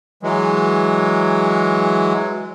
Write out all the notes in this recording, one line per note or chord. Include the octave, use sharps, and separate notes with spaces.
E3 F#3 G#3